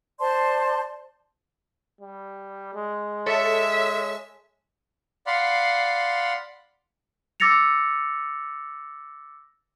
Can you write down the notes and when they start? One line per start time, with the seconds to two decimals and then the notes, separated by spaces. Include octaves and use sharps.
0.19 C5 D5 A5 C6
2.01 G3
2.74 G#3
3.26 A4 C#5 E5
5.27 D5 F5 F#5 B5 C6
7.40 D6 E6 A6 A#6 C#7 F7